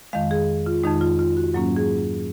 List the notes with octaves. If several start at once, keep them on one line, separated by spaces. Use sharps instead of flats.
F2 D#3 G#3 F5
G#4
F4
F2 D#3 G#3 D#4
F4
F4
F#4
G#2 F#3 A#3 C#4
G#4